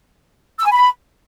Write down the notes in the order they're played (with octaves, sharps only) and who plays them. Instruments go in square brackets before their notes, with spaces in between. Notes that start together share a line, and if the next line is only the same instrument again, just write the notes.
[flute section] E6
G#5
B5